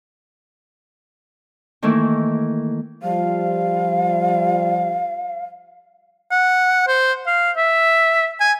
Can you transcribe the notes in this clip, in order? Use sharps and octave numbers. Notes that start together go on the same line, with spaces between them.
D#3 E3 A3 A#3 E4
F3 G3 F5
F#5
C5
F5
E5
G#5